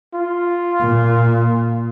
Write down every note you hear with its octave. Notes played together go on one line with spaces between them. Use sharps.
F4
A#2